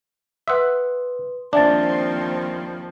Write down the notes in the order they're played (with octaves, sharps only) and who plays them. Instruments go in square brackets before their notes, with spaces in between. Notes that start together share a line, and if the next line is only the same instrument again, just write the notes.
[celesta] B4 C6 D#6 [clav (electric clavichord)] E5 F#5
[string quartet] D#2 F3 C4 [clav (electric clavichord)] D4 [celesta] E5 G#5 A6